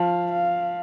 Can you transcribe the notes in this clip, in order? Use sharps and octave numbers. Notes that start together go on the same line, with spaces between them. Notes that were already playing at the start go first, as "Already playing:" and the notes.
Already playing: F3 F5
F5